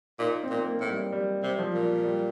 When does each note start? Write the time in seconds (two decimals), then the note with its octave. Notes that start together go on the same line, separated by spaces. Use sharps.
0.19 A#2 D#4
0.43 C4
0.50 A#2
0.66 A#3
0.81 A2
0.89 G3
1.12 G3
1.43 C3
1.59 F3
1.74 A#2
2.04 G3